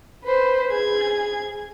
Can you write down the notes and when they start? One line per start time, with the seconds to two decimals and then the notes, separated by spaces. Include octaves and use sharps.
0.24 B4 C5
0.70 G#4 G#6